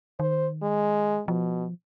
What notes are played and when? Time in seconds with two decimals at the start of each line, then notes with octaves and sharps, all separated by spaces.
0.20 D#3 C5
0.62 G#3
1.28 B2 F3